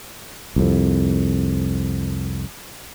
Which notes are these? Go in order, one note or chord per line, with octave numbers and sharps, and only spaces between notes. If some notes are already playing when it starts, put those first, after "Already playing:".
C2 F2